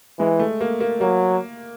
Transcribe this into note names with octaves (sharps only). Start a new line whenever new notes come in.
E3 G#3
A3
A#3
A#3
F#3 A#3